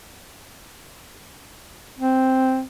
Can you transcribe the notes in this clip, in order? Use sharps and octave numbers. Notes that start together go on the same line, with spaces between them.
C4